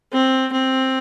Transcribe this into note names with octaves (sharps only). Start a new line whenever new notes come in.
C4
C4